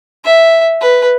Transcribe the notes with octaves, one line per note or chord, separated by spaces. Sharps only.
E5
B4